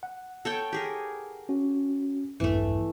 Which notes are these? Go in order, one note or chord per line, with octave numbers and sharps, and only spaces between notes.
F#5
A4 C#5 G5
G4 G#4 A#4
C#4 F#4
A#1 E2 G2 E3 A3